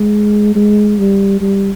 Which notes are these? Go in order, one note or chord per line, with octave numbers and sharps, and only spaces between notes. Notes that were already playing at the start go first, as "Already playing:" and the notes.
Already playing: G#3
G#3
G3
G3